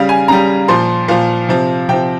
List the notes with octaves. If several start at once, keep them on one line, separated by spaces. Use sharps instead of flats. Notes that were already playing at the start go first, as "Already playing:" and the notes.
Already playing: C#3 G3 F5
G#5
C#3 G3 A#5
A#2 F3 C6
A#2 F3 F5
C3 F3
C3 F3 G5